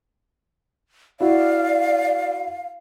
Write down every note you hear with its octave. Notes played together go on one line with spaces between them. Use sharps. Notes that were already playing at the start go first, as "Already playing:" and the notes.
E4 F#4 D5 F5